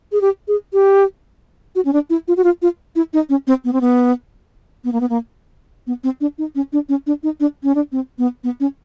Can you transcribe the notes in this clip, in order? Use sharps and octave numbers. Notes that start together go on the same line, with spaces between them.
G#4
G4
G#4
G4
F#4
C#4
D4
E4
F4
F#4
F4
F4
E4
D#4
C#4
C4
B3
C4
B3
B3
A#3
B3
A#3
B3
C4
D4
D#4
C#4
D4
C#4
D4
D#4
D4
C#4
D4
C4
B3
B3
C#4